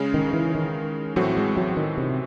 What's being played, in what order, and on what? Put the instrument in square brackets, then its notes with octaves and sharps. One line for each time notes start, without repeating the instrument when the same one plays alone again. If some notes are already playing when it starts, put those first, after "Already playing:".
Already playing: [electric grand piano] C#3 G#3 C#4
[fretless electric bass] D#3
E3
D#3
[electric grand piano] A2 E3 A3 C4 F#4 [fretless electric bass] F#3
[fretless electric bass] G#3
F#3
D#3
C3